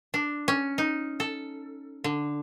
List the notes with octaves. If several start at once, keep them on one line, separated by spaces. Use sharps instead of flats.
D4
C#4
D#4
A4
D3